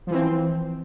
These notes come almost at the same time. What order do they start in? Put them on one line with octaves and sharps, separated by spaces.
F3 E3 C4